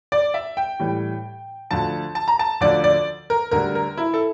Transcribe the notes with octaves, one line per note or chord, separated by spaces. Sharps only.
D5
E5
G5
A2 E3 G3
D2 D3 F3 A5
A5
A#5
A5
D2 D3 F3 D5
D5
A#4
D2 D3 G3 A#4
A#4
E4
A4